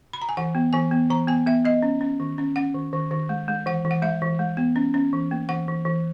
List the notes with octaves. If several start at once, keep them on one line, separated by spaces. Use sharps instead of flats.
B5
A#5
G#5
E3 F#5
B3
E3 G#5
B3
E3 A#5
B3 G#5
B3 E5
B3 D#5
C#4
C#4
D#3
C#4
C#4 F#5
D#3
D#3
D#3
G#3
G#3
E3 F#5
E3
F#5
G#3 E5
E3
G#3
B3
C#4
C#4
E3
A#3
E3 F#5
E3
E3